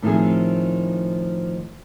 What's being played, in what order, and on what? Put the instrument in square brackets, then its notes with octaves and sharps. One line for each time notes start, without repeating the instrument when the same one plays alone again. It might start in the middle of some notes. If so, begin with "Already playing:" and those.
[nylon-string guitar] A2 D#3 F3 C4 G#4